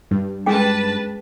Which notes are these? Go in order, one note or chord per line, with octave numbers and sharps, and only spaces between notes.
G2
G#3 C#4 G#4 B4 G5 A5 B6